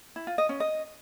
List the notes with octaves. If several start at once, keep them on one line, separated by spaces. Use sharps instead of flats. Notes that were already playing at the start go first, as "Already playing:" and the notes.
E4
F4
D#5
C#4
D#5